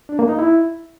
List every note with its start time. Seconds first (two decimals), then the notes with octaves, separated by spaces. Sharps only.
0.09 D4
0.19 A#3
0.29 D#4
0.39 E4